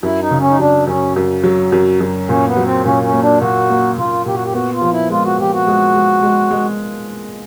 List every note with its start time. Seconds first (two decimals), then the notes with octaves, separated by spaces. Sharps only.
0.03 F#2 E4
0.21 D#4
0.31 C#3
0.40 C#4
0.50 D#4
0.59 F#3 D4
0.87 F#2 C#4
1.16 F#2
1.44 F#3
1.72 F#2
2.00 F#2
2.28 A#2 C#4
2.47 B3
2.57 F#3
2.65 C4
2.85 A#2 C#4
3.03 C#4
3.13 A#3
3.22 D4
3.41 A#2 F#4
3.70 A#3
3.97 A#2 F4
4.26 A#2 G4
4.34 F#4
4.44 G4
4.53 B3 F#4
4.73 F4
4.82 F3
4.91 E4
5.10 G#3 F4
5.25 F#4
5.39 F3 G4
5.52 F#4
5.67 G#3
5.95 G#3
6.23 G#3
6.51 G#3